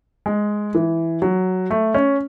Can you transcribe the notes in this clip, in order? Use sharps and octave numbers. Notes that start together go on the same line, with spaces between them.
G#3
E3
F#3
A3
C#4